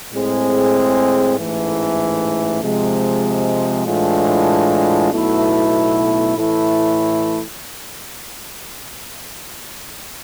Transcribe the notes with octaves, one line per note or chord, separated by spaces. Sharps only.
A2 G#3 C4 G#4
A1 G#2 E3 A3
C3 F3 G#3
A2 E3 G#3 D4 F4
B1 B2 A3 E4
A2 E3 A3 E4